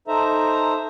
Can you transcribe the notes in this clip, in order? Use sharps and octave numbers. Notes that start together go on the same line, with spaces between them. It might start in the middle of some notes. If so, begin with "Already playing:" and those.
D#4 A4 C5 E5 A#5